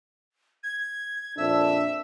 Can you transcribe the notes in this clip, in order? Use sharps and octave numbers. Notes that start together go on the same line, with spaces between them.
G#6
F2 A#2 D4 E5